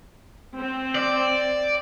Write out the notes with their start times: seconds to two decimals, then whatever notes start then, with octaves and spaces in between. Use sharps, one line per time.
0.56 C4
0.95 D5